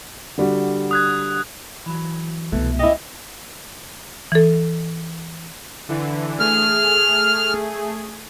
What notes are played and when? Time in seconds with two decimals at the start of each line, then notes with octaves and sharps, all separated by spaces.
0.38 D3 G3 F#4
0.91 D#6 F#6 G#6
1.86 E3 F#3
2.52 C2 B2 E3 A3
2.79 C#4 E4 G4 D#5
4.32 E3 A4
5.89 D3 E3
6.40 A3 G#4 F6